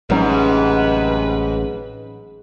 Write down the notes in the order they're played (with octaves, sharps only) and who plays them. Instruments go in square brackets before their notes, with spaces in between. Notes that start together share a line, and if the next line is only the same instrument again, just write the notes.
[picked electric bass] A1 F#3 C#4 [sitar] G#2 [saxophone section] C3 B4